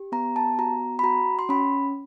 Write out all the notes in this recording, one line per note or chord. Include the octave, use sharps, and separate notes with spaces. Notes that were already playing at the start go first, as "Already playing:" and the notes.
Already playing: G4
B3 A#5
A5
F#4 A#5
B5
F#4 A#5
C6
C#4 B5